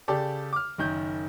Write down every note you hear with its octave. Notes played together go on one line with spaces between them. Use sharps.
C#3 G4 A4 D5
D6 F6
F#1 D#3 G6